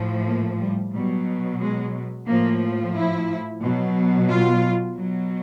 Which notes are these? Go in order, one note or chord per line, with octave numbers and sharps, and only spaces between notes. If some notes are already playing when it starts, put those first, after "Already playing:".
Already playing: A2 F3
A#3
G3
B2 F#3 G3
G#3
A2 F3 A#3
E4
B2 F#3
F4
B2 F#3